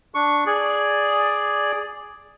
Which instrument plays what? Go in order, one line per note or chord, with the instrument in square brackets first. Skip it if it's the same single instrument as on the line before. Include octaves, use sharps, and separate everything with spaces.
[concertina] D4 C#6
G#4 D5